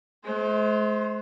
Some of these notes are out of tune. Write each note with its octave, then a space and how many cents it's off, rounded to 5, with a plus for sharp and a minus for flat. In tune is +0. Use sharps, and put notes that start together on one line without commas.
G#3 +45 C5 +0